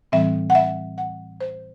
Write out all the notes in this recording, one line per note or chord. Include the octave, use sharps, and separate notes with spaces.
A2 E3 G3 C4 E5
F#5
E5
F#5
C5